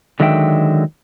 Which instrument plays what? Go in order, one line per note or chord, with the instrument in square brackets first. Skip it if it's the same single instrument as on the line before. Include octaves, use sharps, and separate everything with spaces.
[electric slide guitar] D3 D#3 F#3 G#3 E5 G5